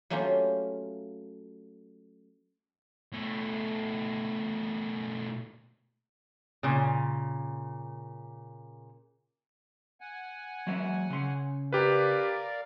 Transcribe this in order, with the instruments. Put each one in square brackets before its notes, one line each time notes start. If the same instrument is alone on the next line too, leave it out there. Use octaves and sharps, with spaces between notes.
[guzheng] F#3 A3 A#3 C#4 F4 G4
[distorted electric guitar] B2 A3
[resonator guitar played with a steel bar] A#2 C#3
[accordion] F#5 G#5
[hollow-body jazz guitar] F#3 G#3 E5
C#3 C6
[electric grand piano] G4 B4 [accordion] A#4 D5 F5